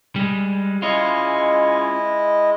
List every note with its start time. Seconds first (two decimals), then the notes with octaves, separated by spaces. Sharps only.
0.16 G3 G#3
0.82 G#3 C#4 E4 F4 D#5